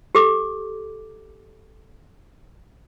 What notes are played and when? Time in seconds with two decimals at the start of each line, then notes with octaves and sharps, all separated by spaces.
0.15 G4 A4 D6